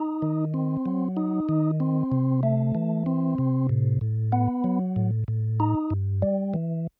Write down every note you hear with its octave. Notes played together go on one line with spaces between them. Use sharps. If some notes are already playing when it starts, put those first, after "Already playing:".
Already playing: D#4
D#3
C4
F#3
D#4
D#3
C4
C3
A3
E3
C4
C3
A2
A2
B3
F#3
A2
A2
D#4
G2
G3
E3